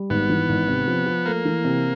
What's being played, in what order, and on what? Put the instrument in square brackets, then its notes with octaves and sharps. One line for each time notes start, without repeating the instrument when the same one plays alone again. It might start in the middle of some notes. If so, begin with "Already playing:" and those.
Already playing: [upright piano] G3
[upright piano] G#1 [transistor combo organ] B3
[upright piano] E3
G#1
C3
F3
F3
[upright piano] A3 [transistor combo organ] A#3
[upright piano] E3
C3